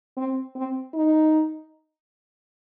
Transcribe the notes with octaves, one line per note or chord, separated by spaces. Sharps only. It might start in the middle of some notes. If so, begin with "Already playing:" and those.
C4
C4
D#4